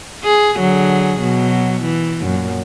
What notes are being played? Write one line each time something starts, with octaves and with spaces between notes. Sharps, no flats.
G#4
D3 F#3 G#4
B2 F#3
E3
F#2 A#2